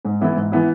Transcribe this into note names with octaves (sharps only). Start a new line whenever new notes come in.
G#2
E3 B3 E4
G#2
E3 B3 E4